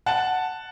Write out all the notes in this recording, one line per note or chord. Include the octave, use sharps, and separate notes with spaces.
F#5 A5